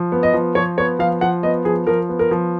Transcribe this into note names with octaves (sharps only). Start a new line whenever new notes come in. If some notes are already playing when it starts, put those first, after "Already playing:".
Already playing: F3
B3
D#5
F3
F3 C#5
B3 C#5
F3 F5
F3 F#5
B3 D#5
F3 G#4
F3 A#4
B3
A#4
F3